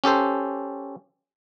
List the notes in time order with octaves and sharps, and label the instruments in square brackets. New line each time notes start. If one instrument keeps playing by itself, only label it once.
[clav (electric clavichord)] C#4 G4 A4 C5